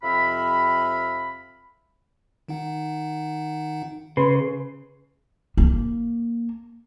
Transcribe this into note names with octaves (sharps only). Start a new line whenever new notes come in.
F2 C3 C4 E5 F5 B5
D#3 D#4 F#5
C#3 B4 C6
A#3